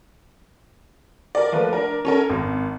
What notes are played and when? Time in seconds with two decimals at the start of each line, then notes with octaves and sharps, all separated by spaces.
1.35 A#4 D5
1.52 F3 A3 A#3 B4
1.73 D4 A#4
2.05 C#4 A4 A#4
2.29 G#1